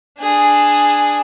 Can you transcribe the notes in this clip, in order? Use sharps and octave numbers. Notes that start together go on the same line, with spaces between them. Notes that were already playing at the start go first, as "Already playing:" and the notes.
D4 G#4